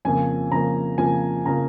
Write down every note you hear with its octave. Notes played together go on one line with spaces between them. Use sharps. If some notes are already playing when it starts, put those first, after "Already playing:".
F2 C#3 F3 A#3 G#5
F2 C#3 F3 A#3 A#5
F2 C#3 F3 A#3 G#5
C#3 F3 A#3 A#5